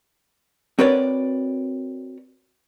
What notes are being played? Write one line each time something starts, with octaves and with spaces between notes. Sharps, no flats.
C4 F#4 A#4 B4 C#5 D5